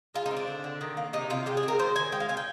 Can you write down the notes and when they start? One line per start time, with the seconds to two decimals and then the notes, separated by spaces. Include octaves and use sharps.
0.14 G#3 F4
0.26 D#4
0.31 C4
0.37 D4
0.47 D3
0.64 D3
0.81 D#3
0.97 A#3
1.13 C3 D#4
1.30 C3 F4
1.46 G#3 G4
1.57 G#4
1.63 C4
1.68 A#4
1.79 D#3 C5
1.95 D#3 G#5
2.12 G#3 G5
2.20 F5
2.29 C4 G#5
2.37 G5